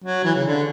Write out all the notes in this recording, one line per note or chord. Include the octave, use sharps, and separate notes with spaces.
F#3
E3
C#3
D3